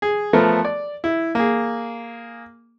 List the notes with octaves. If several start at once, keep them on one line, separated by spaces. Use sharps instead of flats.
G#4
F3 A3 B3 A4 A#4
D5
E4
A#3 G#4